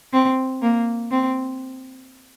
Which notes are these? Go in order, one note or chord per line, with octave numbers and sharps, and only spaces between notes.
C4
A#3
C4